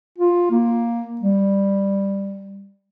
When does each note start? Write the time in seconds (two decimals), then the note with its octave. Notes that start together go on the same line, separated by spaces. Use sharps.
0.18 F4
0.50 A#3
1.21 G3